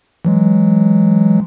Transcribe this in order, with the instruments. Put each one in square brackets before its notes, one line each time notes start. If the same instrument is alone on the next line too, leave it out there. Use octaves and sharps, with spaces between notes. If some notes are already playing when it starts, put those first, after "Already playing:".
[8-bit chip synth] E3 F#3 G#3